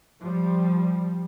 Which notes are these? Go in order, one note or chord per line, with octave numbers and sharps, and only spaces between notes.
F3 G3